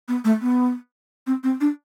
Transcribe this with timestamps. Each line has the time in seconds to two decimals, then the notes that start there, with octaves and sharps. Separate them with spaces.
0.08 B3
0.25 A3
0.42 B3
1.27 C4
1.44 C4
1.61 D4